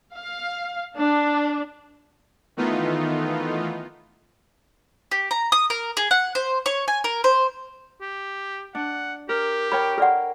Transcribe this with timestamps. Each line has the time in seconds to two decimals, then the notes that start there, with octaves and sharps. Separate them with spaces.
0.15 F5
0.97 D4
2.57 D#3 E3 A3 B3 D#4 F4
5.11 G4
5.31 A#5
5.52 D#6
5.70 A#4
5.97 G#4
6.11 F#5
6.35 C5
6.66 C#5
6.88 G#5
7.04 A#4
7.24 C5
8.01 G4
8.75 D4 F#5
9.29 G4 A#4
9.72 A#4 C#5 G5 B5
9.98 A4 A#4 D5 F#5